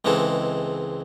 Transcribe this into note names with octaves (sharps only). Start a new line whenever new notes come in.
C#2 E3 G#3 C4 A4